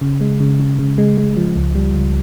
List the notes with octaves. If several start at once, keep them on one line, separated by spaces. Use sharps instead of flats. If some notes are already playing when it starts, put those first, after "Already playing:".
C#3
G#3
C#3
C#3
C#3
G#3
G#3
F3
C#2
G3
C#2